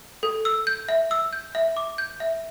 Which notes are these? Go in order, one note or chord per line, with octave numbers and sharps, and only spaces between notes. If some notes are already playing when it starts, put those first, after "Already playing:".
A4
E6
G6
E5
E6
G6
E5
D6
G6
E5